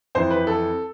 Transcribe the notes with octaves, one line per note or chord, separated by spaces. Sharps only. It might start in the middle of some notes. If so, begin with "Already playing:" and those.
F2 E3 C5
B4
A4